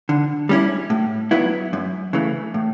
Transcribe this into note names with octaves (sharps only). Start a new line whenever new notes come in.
D3
G3 C#4 E4
A2
F#3 B3 E4
F#2
C#3 E3 A3
A2